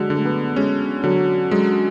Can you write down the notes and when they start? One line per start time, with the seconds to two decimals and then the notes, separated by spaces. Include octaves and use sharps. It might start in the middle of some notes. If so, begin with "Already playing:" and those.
Already playing: D3 F#3 G#3
0.10 D3 A3
0.25 B3
0.56 G#3 C#4
1.04 D3 F#3
1.51 F#3 G#3